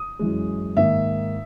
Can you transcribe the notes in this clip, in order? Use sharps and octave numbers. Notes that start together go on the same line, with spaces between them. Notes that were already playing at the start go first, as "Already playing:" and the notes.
Already playing: D#6
F#2 E3 G#3
G#2 D#3 A#3 E5